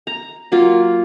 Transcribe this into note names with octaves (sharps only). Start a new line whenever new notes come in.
A#5
F#3 A#3 F4